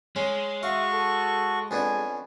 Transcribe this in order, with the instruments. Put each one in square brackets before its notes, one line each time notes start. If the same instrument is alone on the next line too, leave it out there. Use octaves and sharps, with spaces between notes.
[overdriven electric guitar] G#3 [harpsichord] C#4 [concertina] C6
[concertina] F#4 C#6 [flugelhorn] E5 [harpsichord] F5
[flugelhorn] A4
[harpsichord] F2 B3 D4 [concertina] C#4 [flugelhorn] G#5